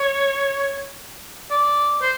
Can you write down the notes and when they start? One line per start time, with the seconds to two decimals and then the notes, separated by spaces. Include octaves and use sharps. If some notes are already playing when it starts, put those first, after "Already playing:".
Already playing: C#5
1.51 D5
2.02 C5